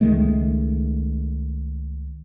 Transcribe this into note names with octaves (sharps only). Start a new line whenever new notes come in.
C#2 D#3 G#3 A3